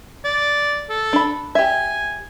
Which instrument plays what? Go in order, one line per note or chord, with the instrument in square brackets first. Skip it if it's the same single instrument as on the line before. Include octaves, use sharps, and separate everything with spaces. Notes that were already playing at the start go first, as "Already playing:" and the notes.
[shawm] D5
A4
[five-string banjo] D4 B5
[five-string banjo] G4 E5 [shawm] G#5